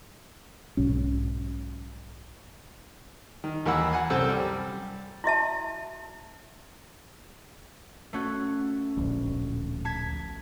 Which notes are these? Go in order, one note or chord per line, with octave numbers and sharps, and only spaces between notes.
B1 G#2 F#3 C#4
D#3
D#2 E3 A#3 F#5 B5 E6
F#5 G#5
C2 F#2 C4 A4 C5 E6
G3
E4 F#4 E5 A5
A3 C#4 F#4
D1 A#1
A5 G#6 B6